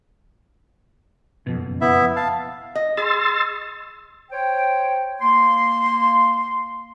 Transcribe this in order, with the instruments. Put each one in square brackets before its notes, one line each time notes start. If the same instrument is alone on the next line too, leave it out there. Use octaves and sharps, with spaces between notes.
[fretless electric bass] F#1 F2 B2
[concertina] B3 E4 E5
F5 A5
[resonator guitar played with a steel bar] D#5
[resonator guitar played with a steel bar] G#4 [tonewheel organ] C6 E6 A6
[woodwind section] C5 C#5 G5
A#3 C6